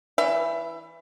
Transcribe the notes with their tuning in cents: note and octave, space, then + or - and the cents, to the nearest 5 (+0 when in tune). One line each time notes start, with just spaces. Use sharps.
E3 +0 E5 +25